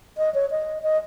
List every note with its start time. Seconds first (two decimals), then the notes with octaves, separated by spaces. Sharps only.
0.18 D#5
0.34 C#5
0.51 D#5
0.83 D#5